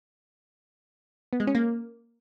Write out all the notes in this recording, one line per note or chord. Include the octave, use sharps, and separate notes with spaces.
B3
G#3
C#4
A#3